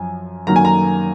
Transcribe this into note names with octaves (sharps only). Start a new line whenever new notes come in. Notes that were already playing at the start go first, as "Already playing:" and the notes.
Already playing: F#2 F3 G#5
F#2 D#3 F#3 A#3 A#5
G#5
A#5